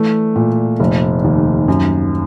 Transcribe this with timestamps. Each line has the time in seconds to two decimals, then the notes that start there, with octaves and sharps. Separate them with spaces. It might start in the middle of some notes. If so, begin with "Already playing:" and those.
Already playing: E3 A3 D4
0.36 A#2
0.80 F1
1.24 D#2
1.68 F#2